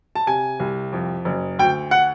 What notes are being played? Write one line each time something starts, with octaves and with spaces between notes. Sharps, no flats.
A5
C3 G#5
C2
F2
F#1
D2 G5
F#5